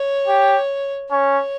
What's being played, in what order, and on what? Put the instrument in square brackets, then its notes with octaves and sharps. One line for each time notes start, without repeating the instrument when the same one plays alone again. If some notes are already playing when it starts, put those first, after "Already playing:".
Already playing: [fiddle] C#5
[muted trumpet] G4
[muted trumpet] C#4 [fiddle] C#5